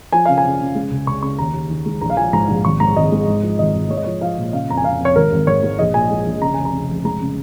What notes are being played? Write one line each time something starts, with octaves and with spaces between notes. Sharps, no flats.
F3 G#5
C#3 F5
G#5
C#3
C#3
G#3
C#2
C#2 C#6
C#3 C#6
D#2 A#5
D#2
D#3
G#3
A#1 A#5
F5
F3 G#5
G#2 A#5
A#1
G#1 C#6
G#2 A#5
G#1 D#5
G#3
G#2
F3
G#1 D#5
G#1
G#3 C#5
D#5
F3 C#5
F3 F5
A#2
C#3 F5
F2 A#5
G#5
F2 F5
F2 C#5
G#1 A#4
G#1
G#2 C#5
G#3
A#1 D#5
A#2 G#5
G#3
A#1
C#3 A#5
F1 G#5
A#5
C#3
F1
G#3 A#5
C#3